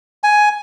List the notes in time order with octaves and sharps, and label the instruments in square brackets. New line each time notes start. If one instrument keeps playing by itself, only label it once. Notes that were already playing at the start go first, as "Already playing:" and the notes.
[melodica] G#5